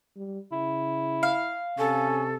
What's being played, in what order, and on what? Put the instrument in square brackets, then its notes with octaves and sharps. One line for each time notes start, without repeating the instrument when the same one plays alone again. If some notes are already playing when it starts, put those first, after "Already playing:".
[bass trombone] G3
[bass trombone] C#3 [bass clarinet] E4
[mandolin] F5
[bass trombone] C3 [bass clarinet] C#4 [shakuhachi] A4